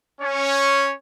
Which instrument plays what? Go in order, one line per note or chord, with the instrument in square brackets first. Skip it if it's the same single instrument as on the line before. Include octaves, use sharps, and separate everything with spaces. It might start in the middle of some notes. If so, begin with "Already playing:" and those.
[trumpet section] C#4 C#5